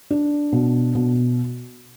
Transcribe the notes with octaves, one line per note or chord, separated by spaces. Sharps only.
D4
B2
B2